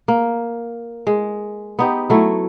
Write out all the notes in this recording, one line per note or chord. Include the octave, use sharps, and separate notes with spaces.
A#3
G#3
B3 D#4 G4
F#3 A3 E4